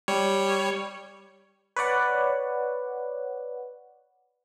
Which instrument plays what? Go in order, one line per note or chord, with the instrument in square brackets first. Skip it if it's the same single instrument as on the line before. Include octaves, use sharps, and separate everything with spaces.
[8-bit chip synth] G3 C#5
[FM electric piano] B4 C#5 D5 F#5